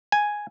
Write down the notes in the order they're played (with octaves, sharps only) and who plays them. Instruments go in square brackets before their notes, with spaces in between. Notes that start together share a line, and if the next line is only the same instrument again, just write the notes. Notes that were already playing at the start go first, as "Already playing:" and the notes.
[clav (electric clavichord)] G#5